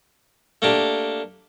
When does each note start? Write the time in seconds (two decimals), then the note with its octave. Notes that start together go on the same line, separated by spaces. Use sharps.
0.62 A3 A#3 D4 G4